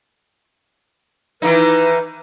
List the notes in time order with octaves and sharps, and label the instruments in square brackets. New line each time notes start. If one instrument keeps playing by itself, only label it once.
[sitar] D#3 E3 D#4 [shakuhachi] B4